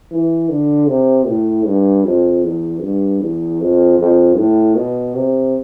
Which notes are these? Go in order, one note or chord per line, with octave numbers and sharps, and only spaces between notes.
E3
D3
C3
A2
G2
F2
E2
G2
E2
F2
F2
A2
B2
C3